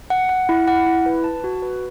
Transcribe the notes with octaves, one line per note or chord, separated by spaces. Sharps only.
F#5
F#5
E4
F#5
E4
B4
A5
F#4
B4